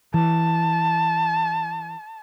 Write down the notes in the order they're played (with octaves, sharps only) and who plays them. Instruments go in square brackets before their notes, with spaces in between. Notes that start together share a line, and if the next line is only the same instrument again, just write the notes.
[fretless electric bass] E3 [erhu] A5